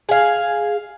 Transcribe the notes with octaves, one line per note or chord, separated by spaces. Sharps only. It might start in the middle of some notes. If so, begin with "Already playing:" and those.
G#4 F5